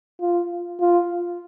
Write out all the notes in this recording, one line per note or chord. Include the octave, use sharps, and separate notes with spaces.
F4
F4